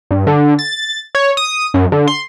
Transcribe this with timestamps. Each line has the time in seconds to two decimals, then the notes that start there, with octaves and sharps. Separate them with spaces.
0.11 G2
0.27 D3
0.59 A6
1.15 C#5
1.37 D#6
1.74 F#2
1.92 D3
2.07 C6